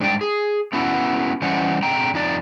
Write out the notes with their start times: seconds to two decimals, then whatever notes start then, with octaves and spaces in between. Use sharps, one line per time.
0.01 G#2 G3 D4 D5 G5
0.21 G#4
0.73 A3 B3 C#4 E4 F#4
1.42 E3 G3 C#4 C5 D#5 F#5
1.83 B2 D3 C4 G5 A#5
2.14 F2 D#4 D5